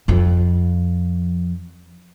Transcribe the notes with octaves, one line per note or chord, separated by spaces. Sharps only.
F2 F3